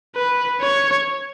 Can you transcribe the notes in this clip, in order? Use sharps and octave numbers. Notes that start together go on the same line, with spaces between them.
B4
C#5